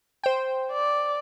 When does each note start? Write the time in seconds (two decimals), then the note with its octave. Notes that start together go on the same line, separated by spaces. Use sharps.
0.24 C5 G5
0.71 D5